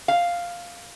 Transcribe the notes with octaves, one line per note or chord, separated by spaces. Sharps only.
F5